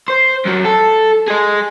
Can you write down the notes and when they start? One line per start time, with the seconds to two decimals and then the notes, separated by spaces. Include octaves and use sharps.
0.08 C5
0.45 F#2 F#3
0.65 A4
1.28 G#4 D#5